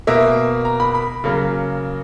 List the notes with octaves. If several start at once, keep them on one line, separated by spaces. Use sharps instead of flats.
B2 A#3 E5
A#5
B5
B5
C#3 F#3 A#3